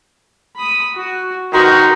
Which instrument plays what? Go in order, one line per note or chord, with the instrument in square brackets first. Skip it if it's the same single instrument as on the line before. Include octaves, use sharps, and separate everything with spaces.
[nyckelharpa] B5 D#6
F#4
[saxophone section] D#3 F#4 [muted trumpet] D#4 [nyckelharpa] A#4 B4 [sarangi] C6